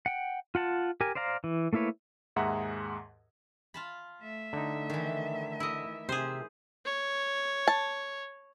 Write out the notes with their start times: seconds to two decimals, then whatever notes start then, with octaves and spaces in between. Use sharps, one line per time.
0.06 F#5 G5
0.55 F4 F#5 A5
1.01 G4 A#4 G#5
1.15 C5 D5 F5 A#5
1.44 E3
1.73 A3 A#3 E4 B4 C#5
2.36 D#2 G#2 G#4 E5 F#5 A#5
3.74 F4 A5 B5
4.21 A3 E5
4.53 D3 D#4
4.90 D#3 E3
5.60 E4 D#5
6.09 C3 G#4 C5
6.86 C#5
7.68 A5